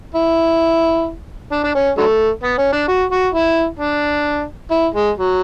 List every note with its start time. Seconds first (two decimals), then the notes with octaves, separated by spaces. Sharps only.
0.15 E4
1.52 D4
1.64 D4
1.75 C#4
1.98 D3 F#3 A3
2.43 B3
2.58 C#4
2.73 D4
2.88 F#4
3.12 F#4
3.34 E4
3.79 D4
4.71 E4
4.94 G#3
5.17 F#3